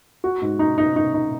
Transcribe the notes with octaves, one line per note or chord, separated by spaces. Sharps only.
F#4
G#2
D#4
D#4
D#4
D#4